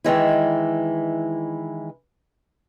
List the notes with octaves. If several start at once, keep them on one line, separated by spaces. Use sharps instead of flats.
D#3 E3 G#3 E4